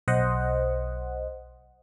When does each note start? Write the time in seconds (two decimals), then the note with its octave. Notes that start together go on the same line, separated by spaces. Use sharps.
0.08 B1 C5 D#5 F#5